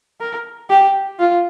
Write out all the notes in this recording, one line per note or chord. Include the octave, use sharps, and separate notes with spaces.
A#4
G4
F4